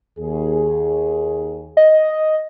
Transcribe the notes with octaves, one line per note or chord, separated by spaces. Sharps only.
D#2 G#4
D#5